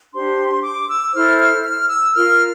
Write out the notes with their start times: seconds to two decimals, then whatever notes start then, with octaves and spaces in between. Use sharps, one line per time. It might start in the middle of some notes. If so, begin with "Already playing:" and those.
0.13 D4 G4 C5 C6
0.63 D6
0.89 E6
1.13 E4 A4 C5 F6
1.39 F6
1.63 F6
1.89 E6
2.14 F4 A#4 F6